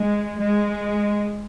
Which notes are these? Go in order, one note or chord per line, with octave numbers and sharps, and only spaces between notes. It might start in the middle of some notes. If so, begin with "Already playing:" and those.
Already playing: G#3
G#3